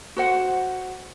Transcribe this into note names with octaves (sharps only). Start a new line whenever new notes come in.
F#4 C5 F#5